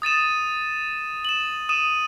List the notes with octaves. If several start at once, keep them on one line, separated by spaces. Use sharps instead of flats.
D#6 A6 D#7 E7
E7 F#7
D#6 D#7 E7